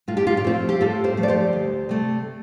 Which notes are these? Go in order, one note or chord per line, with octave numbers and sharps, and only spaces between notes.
A2 F4
G4
F4
G4
F3 A3 C4 F4
G4
A2 F4 A4
G4 C5
F3 A3
D5
G4 C5
D2
C3 A3